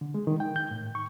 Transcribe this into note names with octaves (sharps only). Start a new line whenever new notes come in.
D3
G#3
D#3
G5
G6
A2
C#6